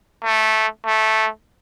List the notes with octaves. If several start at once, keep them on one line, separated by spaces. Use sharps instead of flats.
A3
A3